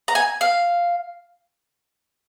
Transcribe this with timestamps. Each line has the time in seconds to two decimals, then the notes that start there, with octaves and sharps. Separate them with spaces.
0.08 A#5
0.15 G#5
0.41 F5